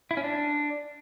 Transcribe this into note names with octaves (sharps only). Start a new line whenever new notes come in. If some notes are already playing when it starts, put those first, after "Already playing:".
E4
C#4
D4